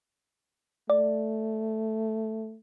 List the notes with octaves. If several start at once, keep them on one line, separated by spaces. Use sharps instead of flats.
A3 D5